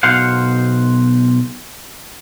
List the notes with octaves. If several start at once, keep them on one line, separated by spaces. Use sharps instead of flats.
B1 B2 C5 F5 F#5